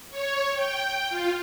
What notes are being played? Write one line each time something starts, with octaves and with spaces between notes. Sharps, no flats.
C#5
G5
F4